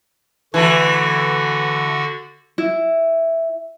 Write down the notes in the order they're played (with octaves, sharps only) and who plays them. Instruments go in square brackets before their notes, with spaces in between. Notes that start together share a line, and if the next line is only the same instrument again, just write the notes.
[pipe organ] D3 F#4 [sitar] E3 A3
[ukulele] E4